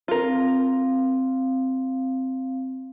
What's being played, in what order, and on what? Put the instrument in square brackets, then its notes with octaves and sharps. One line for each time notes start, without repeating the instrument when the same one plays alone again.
[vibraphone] C4 F5 [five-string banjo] F4 A#4